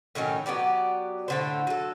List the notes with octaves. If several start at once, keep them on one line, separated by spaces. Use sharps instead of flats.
A2 D#3 F#3 C#4
F#3 B3 G4 D5
A2 D3 C5
F#3 A4